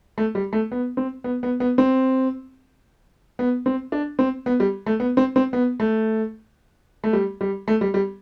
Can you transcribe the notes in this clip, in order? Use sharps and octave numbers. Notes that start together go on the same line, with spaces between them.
A3
G3
A3
B3
C4
B3
B3
B3
C4
B3
C4
D4
C4
B3
G3
A3
B3
C4
C4
B3
A3
A3
G3
G3
A3
G3
G3